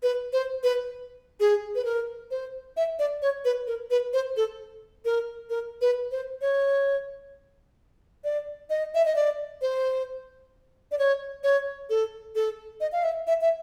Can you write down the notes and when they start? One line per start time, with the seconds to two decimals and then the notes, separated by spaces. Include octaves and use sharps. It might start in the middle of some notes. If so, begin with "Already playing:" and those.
0.03 B4
0.33 C5
0.63 B4
1.40 G#4
1.75 B4
1.85 A#4
2.31 C5
2.77 E5
2.99 D5
3.22 C#5
3.45 B4
3.67 A#4
3.91 B4
4.13 C5
4.37 A4
5.05 A#4
5.50 A#4
5.81 B4
6.11 C5
6.41 C#5
8.24 D5
8.70 D#5
8.95 E5
9.05 D#5
9.16 D5
9.62 C5
10.91 D5
10.99 C#5
11.43 C#5
11.90 A4
12.35 A4
12.81 D#5
12.92 F5
13.03 E5
13.27 E5
13.41 E5